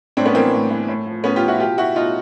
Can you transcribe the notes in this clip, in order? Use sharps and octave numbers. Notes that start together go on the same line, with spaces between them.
A2 C4 D4
B3 C#4
E3 A#3 C4
A2
E3
A2
F3
A2 B3 C#4
F4 G4
F3
E4 F#4
B2 F4 G4
E4 F#4
B2 D#4 F4